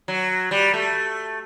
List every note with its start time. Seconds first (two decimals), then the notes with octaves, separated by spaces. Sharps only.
0.08 F#3
0.51 G3
0.74 A3